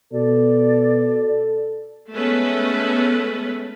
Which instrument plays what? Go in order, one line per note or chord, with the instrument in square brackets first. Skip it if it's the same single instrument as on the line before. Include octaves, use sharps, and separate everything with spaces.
[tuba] B2 [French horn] A4 [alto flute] D5
[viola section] G#3 A3 B3 C#4 A4 B4